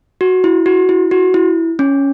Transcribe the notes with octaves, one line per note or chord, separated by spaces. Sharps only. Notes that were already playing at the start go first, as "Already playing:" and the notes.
F#4
E4
F#4
E4
F#4
E4
C#4